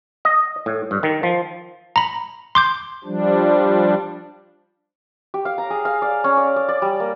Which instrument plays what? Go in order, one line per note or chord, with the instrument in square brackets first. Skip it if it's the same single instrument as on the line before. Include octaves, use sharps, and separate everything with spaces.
[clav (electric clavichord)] D#5
A2
G2
D#3
F3
[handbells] A#5 B5
C6 D6 G6
[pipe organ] F3 G3 D4
[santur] G4
F5
A#5
G#4
F5
D5
C#4
D5
D5
D5
G3
A#3